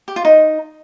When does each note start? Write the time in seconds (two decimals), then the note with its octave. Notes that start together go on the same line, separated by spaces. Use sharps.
0.08 G4
0.16 F4
0.25 D#4